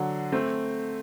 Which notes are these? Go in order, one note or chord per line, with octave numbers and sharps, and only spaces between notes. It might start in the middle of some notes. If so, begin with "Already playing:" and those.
Already playing: D3 F#3
A3 C4